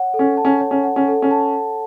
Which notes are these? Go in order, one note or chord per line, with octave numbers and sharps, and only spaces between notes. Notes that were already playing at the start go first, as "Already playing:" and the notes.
Already playing: C#5 F#5
A4
C#4
A5
C#4
C#5
C#4
F#5
C#4
A4
C#4
A5